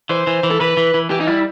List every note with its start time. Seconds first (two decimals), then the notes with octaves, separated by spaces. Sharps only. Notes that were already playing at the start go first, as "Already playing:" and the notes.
0.09 E3 C5
0.27 E3
0.43 E3
0.51 A4
0.60 E3 B4
0.77 E3
0.94 E3
1.10 E3 G4
1.20 D#4
1.27 G3 E4